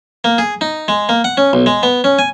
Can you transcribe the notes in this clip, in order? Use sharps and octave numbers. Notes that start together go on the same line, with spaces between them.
A#3
G#4
D#4
G#3
A#3
F#5
C#4
B1
G#3
B3
C#4
G#5